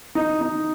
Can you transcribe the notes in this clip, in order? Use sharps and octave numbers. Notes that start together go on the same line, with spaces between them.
D#4
D#4